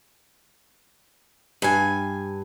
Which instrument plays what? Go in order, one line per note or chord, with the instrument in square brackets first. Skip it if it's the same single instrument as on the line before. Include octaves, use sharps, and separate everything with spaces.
[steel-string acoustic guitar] G2 G#5